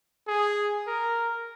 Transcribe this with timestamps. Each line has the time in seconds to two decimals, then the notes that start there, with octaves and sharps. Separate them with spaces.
0.28 G#4
0.87 A#4